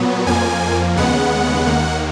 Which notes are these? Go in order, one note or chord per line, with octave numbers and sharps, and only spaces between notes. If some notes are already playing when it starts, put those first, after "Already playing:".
Already playing: A#2 F#3 B3
F2 F3 A#3 G#5
D#2 C#3 G#3 B3 F#5
D#2 D#3 A#3